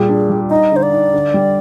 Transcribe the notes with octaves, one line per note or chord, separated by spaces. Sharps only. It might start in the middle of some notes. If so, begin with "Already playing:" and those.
Already playing: A#2 G3 G#4
D4
G3
D#4 D#5
D3 C5
D5
D#4
D3
G3